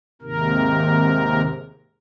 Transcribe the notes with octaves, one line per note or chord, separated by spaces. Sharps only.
D#2 G#2 C3 A#4